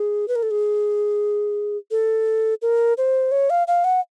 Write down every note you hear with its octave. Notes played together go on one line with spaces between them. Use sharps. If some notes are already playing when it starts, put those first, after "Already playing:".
Already playing: G#4
B4
A#4
A4
G#4
A4
A#4
C5
C#5
F5
F5
F#5